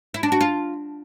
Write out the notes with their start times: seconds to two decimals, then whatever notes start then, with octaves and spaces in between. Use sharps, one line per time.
0.14 E4
0.23 D4
0.32 F#4
0.41 F4